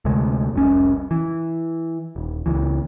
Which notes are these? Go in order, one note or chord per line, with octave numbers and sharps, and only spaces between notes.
D2 C3 G#3 A3
F1 C2 C#4
E3
D#1
C#2 E3